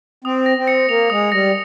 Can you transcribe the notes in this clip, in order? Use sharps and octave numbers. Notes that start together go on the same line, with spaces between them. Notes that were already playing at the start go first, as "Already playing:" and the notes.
C4 D#6
A#6
C4
C#7
A#3 F7
G#3 D#6
G3 A#6